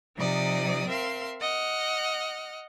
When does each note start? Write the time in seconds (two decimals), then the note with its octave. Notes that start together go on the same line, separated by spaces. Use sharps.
0.16 C3 F3 D#4 D5 D#6
0.87 C4 A#4 E5 F5 C6
1.40 D#5 F#5 F6